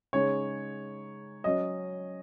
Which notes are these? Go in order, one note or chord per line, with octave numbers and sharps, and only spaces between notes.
C#3 G#3 D#4 C#5
F#3 C#4 D#5